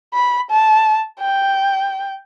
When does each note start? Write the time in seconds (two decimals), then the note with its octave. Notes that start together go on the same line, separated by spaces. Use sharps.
0.14 B5
0.51 A5
1.20 G5